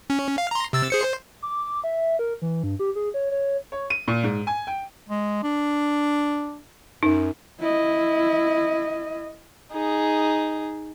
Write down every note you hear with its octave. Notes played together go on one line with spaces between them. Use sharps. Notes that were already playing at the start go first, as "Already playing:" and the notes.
C#4
F5
A#5 C6
C3 E6 A6
G#4 C5 C#7
C5
D6
E5
A#4
E3
G2
G4
G#4
C#5
C#5
C#5
D#7
A#2
G#2
G#5
G5
G#3
D4
F#2 D#4
E4 D#5
D#4 G#4